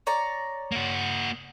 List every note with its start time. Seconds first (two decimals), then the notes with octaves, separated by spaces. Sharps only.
0.07 C#5 D5 A#5
0.72 A#3 F#4